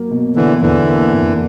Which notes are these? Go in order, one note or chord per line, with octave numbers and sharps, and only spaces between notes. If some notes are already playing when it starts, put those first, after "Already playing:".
Already playing: F#3 A#3
B2
B2 D3 E3
E2 D3 E3
A#3
F2